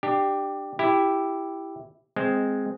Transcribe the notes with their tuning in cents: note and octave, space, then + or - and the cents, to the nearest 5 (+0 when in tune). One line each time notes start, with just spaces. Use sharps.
D4 +25 G4 +0
E4 +0 G4 +0
G#3 +0 C4 -10